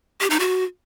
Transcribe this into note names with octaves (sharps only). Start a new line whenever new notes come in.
G4
D#4
F#4